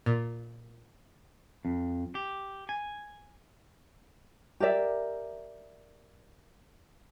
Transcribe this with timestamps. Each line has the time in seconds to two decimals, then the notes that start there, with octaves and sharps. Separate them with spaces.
0.06 A#2
1.65 F2
2.15 G4
2.69 G#5
4.60 G4 A#4 D5 E5